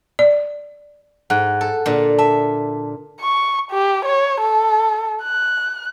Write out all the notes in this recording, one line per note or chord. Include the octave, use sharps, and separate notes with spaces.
D5
G#2 F#5 F#6
A4
A#2 D3
E5 A5
C#6
G4
C#5
A4
F#6